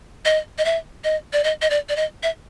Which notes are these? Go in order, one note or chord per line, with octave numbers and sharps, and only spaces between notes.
D#5
D#5
E5
D#5
D5
D#5
D#5
D5
D5
D#5
E5